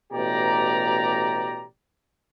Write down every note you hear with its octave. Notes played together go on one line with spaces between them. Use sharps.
A1 B2 G4 D5 A#5